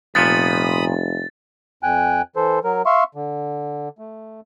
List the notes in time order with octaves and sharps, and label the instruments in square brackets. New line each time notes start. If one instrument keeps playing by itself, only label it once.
[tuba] F1 [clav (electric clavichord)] A#2 F3 B3 [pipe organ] B5 D#6 [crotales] A6
[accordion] F2 G5 G#5 F#6
E3 A4 C5
F#3 A#4
E5 F5 C6 C#6
D3
A3